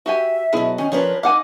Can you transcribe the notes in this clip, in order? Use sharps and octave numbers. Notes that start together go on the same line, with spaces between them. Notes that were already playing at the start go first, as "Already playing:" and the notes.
F#4 G4 E5 G#5
B2 F#3 E4 G#4
D#3 C#4 G#5
F3 C#4 D4 A#4 B4 C#5
D#4 F5 F#5 G#5 D6